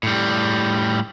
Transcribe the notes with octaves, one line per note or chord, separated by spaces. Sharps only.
A2 G3